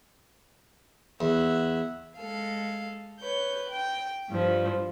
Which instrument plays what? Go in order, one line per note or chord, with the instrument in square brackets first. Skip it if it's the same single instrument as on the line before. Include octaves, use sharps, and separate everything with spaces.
[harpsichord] E2 [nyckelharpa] E5 F#5
[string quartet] G#3 A4 F5
B4 C#5 G6
G5
G2 F3